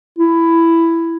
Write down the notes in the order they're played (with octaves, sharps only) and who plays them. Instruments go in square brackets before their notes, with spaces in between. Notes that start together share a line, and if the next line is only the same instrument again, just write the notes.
[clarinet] E4